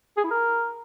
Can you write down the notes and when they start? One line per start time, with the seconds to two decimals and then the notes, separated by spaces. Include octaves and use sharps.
0.17 G#4
0.24 E4
0.31 A#4